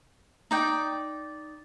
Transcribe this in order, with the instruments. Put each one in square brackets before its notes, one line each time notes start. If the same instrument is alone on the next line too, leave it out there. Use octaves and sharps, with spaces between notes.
[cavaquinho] D#4 D5 G5